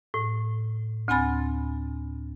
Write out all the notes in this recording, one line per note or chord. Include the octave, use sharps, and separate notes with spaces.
A2
D2 C4 G#5 B5 A6